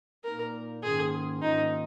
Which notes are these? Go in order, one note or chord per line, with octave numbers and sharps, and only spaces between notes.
A#2 A#3 D#4 A#4
G#2 D#3 A#3 C#4 F4 G#4
G#2 D#3 A#3 C#4 D#4 F4